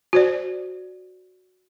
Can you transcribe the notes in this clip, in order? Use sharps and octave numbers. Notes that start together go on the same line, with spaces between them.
F#4 C5 D5